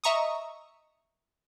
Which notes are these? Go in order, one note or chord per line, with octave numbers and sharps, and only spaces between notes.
D#5 E5 A#5 C#6 D#6